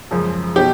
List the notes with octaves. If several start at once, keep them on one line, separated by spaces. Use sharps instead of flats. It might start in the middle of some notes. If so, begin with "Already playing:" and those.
F#2 C#3 F3 G#3
B2 G4